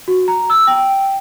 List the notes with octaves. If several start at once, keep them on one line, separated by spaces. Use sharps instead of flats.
F#4
A#5
E6
G5